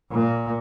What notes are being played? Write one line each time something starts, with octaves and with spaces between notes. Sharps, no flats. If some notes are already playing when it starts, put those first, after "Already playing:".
A#2